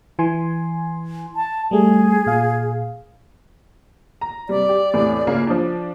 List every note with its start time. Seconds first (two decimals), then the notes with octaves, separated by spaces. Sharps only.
0.19 E3 G#5 C6
1.36 A5
1.71 G3 A3 G#4
2.26 A#2 F5
4.21 A#5
4.49 C3 G3 D5
4.69 G4
4.94 E2 A2 C3
5.27 C#2 C#3 A#3
5.47 F3 D4